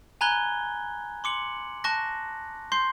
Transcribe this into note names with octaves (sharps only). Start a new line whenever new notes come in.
G#5 A#5 B5 F#6 G#6 G7
C6 D6 C#7 F#7
A5 C#6 F#6 A#6
C6 C#6 G6 C7